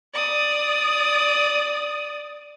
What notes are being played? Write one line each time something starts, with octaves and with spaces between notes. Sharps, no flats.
D5 D#6